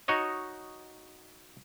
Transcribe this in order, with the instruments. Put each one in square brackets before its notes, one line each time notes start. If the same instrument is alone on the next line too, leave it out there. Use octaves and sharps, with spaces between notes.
[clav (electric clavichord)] D#4 F#4 C#5 D#5